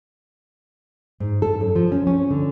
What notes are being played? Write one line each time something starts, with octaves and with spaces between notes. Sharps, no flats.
G#2
A4
F#2
F3
C#4
C#4
D3